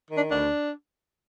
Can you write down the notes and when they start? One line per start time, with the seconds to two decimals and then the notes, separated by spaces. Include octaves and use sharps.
0.09 D#3
0.16 D4
0.30 D2 D4